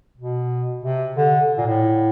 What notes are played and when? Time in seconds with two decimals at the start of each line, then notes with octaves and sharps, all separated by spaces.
0.18 B2
0.83 C3
1.17 D3
1.58 A#2
1.66 A2